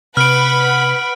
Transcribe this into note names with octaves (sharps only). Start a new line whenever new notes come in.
C3 B4 F#5 B5 F6 D7